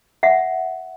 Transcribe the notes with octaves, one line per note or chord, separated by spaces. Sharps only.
E5 F#5